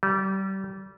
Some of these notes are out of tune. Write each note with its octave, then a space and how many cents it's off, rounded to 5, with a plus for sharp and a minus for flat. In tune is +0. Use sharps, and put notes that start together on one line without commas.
G3 -25